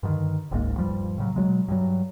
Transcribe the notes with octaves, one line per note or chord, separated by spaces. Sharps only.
G2 D3 D#3
F#1 C#2 G#2 A#3
D#1 G2 F3 G3
A2 C#3 F#3
B2 F#3 G#3
G2 F#3